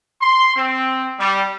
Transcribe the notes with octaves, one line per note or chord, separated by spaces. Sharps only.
C6
C4
G3